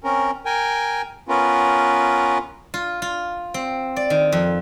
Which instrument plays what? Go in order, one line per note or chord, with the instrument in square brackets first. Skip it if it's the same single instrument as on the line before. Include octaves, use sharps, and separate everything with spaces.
[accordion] C4 C#4 A#4
A#4 G5 G#5
B3 C#4 F4 A#4 B4
[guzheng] F4
F4
C4
D5
D#3
F2